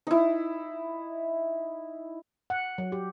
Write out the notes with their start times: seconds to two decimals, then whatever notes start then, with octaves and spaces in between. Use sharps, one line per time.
0.07 D#4 E4
2.50 F#5
2.78 F#3
2.92 G4